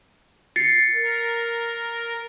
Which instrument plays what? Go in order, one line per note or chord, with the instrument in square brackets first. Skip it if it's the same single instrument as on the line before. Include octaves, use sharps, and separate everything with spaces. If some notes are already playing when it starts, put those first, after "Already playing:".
[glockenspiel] A6 C7 C#7
[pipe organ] A#4